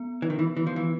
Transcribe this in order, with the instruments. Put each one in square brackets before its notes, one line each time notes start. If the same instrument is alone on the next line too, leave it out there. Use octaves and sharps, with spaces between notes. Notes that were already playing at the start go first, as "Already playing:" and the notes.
Already playing: [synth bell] B3
[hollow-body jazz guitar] E3
D#3
E3
E3
F3
E3